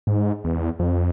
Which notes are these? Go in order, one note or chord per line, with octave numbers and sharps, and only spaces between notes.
G#2
E2
F2